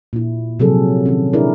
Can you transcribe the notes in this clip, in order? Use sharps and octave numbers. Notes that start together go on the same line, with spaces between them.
A#2 E4
C3 F3 F#3 C4 G#4 A4
D#3 C4 C#4
D4 E4 G#4 A#4 D5